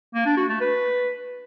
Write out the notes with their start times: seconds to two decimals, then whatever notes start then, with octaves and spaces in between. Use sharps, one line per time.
0.14 A#3
0.26 D4
0.37 F#4
0.49 A3
0.60 B4